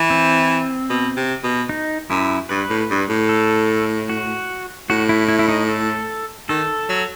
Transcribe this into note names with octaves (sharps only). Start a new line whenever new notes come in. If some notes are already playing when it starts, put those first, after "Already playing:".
Already playing: E3
C4
B2
C3
B2
D#4
F#2 E4
G2 B4
A2
G2
A2
A4
F#4
A2 F#4
E4
E4
E4
D#4
A4
D#3 A4
F#3